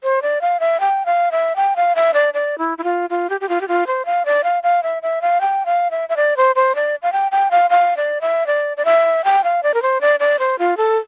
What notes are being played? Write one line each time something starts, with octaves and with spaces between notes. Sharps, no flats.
C5
D5
F5
E5
G5
F5
E5
G5
F5
E5
D5
D5
E4
E4
F4
F4
G4
G4
F4
G4
F4
C5
F5
D5
F5
F5
E5
E5
F5
G5
F5
E5
E5
D5
C5
C5
D5
F5
G5
G5
F5
F5
D5
E5
D5
D5
E5
G5
F5
D5
A#4
C5
D5
D5
C5
F4
A4